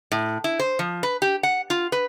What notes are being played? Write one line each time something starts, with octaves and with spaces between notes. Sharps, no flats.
A2
E4
C5
F3
B4
G4
F#5
F4
B4